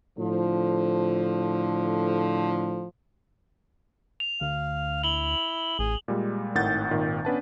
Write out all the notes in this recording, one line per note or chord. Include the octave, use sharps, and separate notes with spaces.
A2 D3 F3
F7
D2 F5
E4 F#7 G7
A1 G#4
A#2 G3 G#3
G#1 A2 D#3 F#5 G6 A6
G#1 A#2 D#3
B3 C#4 D4 B4 F#5 A5